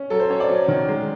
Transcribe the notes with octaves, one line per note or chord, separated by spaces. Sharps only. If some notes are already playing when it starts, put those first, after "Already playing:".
Already playing: C#4
F#3 A4
C5
C#4 C#5
D5
F#3
D#3
G#3